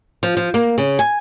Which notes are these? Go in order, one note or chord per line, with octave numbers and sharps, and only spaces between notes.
F3
F3
A#3
C#3
G#5